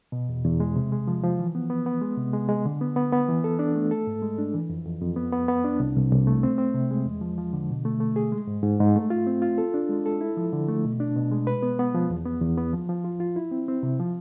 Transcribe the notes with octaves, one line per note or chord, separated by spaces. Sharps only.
B2
E2
E2
G#3
C3
G#3
F3
F3
E3
B3
B3
B3
G#3
C3
G#3
G#3
D3
B3
B3
B3
E3
A4
D4
A3
A4
G#2
G#3
D4
E3
F2
F2
F2
B3
B3
B3
D4
C2
C2
C2
A3
C4
C4
C3
G#3
E2
F3
F3
D3
B2
A3
A3
G#4
G#3
G#2
G#2
G#2
A3
F4
C4
F4
A4
D4
G#3
A4
E4
F3
D3
A3
B2
D4
B2
G#3
B4
B3
B3
F3
E2
B3
E2
B3
F3
F3
F4
F4
E4
C4
C4
C3
F3